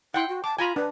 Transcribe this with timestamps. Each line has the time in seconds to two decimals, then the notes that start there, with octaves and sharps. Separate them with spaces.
0.14 E4 F#5 G5 C6
0.29 F#4
0.44 A5 D6
0.59 F4 G#5 A#5 B5
0.76 D4 B4